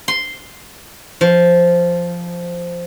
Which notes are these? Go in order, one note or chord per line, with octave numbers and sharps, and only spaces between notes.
C6
F3